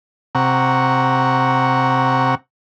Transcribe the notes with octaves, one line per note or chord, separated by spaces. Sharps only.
C3 F#5 A#5 C#6